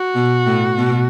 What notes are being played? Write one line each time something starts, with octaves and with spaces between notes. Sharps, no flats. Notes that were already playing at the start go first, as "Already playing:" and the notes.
Already playing: F#4
B2
A2
B2